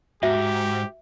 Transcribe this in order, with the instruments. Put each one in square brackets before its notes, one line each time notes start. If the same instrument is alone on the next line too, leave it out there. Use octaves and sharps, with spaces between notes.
[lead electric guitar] G#2 [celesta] F#4 F#5 [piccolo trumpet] G4 [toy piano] E5